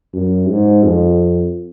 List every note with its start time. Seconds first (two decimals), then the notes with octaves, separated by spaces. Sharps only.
0.14 F#2
0.49 G#2
0.84 F2